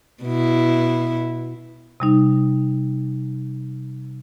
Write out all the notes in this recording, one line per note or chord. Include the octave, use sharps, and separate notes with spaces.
B2 E4
C3 G3 D#4